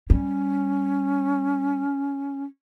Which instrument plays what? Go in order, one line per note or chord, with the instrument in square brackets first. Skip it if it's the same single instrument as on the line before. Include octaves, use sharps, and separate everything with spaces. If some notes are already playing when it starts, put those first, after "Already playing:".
[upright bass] G3 [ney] C#4